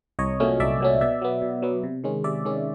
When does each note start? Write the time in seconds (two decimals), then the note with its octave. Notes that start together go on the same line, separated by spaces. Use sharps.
0.19 C2 C#5 D#5
0.40 A#2 F#3 A3 C#4
0.60 C2 D5 E5
0.81 A#2 F#3 A3 C#4
1.01 B2 D5 E5
1.22 F#3 B3
1.42 B2
1.62 F#3 B3
1.83 C3
2.04 D#3 G#3 C#4
2.24 C3 D5 E5
2.45 D#3 G#3 C#4